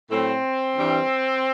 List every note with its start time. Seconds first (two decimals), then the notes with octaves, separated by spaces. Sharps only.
0.11 A2 F#3 A3 C4
0.77 G2 E3 G3